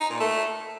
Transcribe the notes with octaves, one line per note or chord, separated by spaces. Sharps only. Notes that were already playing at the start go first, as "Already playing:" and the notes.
D#4
A#2
A3